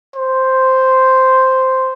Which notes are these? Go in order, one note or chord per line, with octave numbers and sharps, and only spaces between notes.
C5